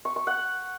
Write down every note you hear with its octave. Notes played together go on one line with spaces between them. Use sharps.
C#6
C#6
F#5